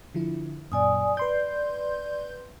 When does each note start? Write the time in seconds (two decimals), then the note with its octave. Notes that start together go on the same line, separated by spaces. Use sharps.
0.15 D3 F3 E4
0.72 F#2 A#2 D5 G#5 D#6
1.17 B4 D5 C6 G6